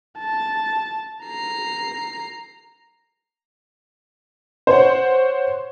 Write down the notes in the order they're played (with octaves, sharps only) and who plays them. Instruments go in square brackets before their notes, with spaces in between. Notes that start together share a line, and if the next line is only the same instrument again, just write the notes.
[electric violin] A5
A#5 C7
[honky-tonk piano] C5 C#5 F#5